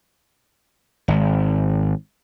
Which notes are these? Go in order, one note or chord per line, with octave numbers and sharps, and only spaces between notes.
G#1